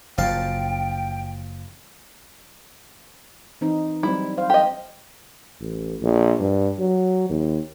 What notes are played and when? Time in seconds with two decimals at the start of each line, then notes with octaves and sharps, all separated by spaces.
0.18 F#1 F#2 F3 F5 G5 A5
3.61 E3 C4 D#4
4.03 F#3 G3 C4 E4
4.38 C5 F5
4.50 G4 D#5
5.61 A1
6.02 A#1
6.39 G2
6.79 F#3
7.29 D#2